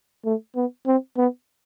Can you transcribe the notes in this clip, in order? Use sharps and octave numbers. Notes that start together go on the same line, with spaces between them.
A3
B3
C4
B3